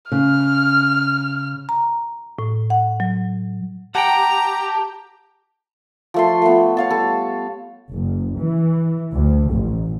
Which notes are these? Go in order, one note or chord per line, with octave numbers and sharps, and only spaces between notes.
C#3 F6
A#5
A2
F#5
F#3
G4 F#5 G5 A5 A#5
F3 A3 C6
A3 B3
C#5 F5 A5
G3 A4
F#1
E3
D2
A1